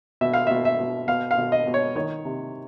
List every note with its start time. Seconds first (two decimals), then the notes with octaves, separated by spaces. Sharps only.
0.21 B2 E5
0.33 F5
0.47 B2 E5
0.65 E5
0.80 B2
1.08 B2 F5
1.31 F5
1.38 B2
1.52 D#5
1.67 B2
1.74 C#5
1.95 D#3 C#5
2.25 C3